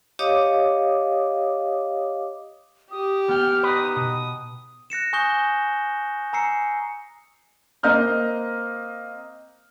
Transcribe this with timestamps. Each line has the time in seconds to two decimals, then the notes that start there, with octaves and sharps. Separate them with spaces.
0.19 G4 C#5 D#5 F5 D6 D#6
2.91 G4 D#6
3.28 B3 G5 F6
3.63 D#4 B4 D#6
3.95 B2 D#6
4.90 F#6 A#6 C#7 E7
5.13 G#5 C#6 D#6 G6 A#6 G7
6.33 G#5 A#5 E6 C7 C#7
7.83 A#3 C4 D#5 A#5 F6 G6